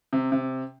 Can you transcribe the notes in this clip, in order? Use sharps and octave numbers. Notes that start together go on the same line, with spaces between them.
C3
C3